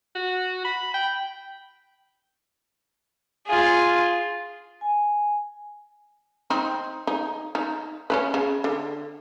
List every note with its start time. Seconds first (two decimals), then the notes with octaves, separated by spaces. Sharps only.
0.15 F#4
0.65 B5
0.94 G5
3.47 F4 G#4
4.81 G#5
6.50 C4 D#4
7.07 D#4
7.55 D#4
8.10 C#4 E4 B4
8.34 C#3
8.64 D3